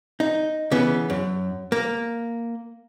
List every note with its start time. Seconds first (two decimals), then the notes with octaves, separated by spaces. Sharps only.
0.20 D#4
0.71 C#3 E3 B3
1.10 F#2
1.72 A#3